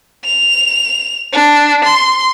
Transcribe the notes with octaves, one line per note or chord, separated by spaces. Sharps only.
F7
D4
C6